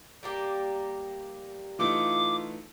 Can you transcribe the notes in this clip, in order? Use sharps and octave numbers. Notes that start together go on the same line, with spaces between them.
G3 A#3 G4
E3 A3 D#4 F4 D6